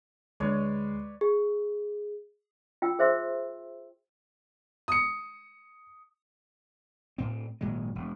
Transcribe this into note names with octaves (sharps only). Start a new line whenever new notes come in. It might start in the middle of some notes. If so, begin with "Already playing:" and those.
D2 D3 G#3 B4 C#5 D5
G#4
F4 G5 B5 E6
G#4 C5 E5 C6 E6
D#6 C#7
A2 C4
G#1 A#2 F#3 G#3
E1